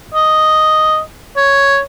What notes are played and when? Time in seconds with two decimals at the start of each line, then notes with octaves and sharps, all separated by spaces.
0.15 D#5
1.37 C#5